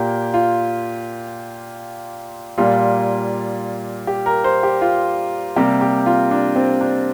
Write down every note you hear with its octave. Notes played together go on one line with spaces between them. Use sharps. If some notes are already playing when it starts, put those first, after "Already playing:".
Already playing: A#2 A#3 G4
F4
A#2 G3 A#3 F4
G4
A#4
C5
G4
F4
C3 G3 A#3 G4
G4
F4
D4
C4
D4